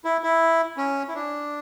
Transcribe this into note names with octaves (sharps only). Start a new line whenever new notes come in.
E4
E4
C#4
E4
D4